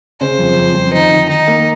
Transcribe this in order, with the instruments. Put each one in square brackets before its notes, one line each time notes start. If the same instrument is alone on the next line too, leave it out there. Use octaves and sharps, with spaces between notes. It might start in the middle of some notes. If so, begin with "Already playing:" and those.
[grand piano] C#3 [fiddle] C5
[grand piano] F2
F2
F2
[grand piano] D#3 [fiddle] D#4
[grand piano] D#3
[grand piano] D#3 [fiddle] D#4
[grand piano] A#3